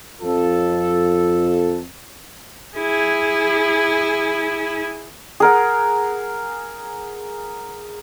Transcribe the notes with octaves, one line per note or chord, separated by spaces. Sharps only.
F2 F4 A4
E4 G#4
G#4 A#4 F#5